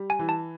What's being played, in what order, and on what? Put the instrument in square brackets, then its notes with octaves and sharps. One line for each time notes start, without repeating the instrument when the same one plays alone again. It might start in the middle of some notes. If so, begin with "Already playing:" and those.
Already playing: [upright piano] G3
[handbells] G#5
[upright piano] E3
[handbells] A5